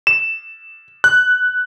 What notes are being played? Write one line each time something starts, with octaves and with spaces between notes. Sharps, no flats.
E7
F#6